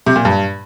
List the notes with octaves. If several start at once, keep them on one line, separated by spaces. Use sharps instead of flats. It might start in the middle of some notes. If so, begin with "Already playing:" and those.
C3
A#2
G2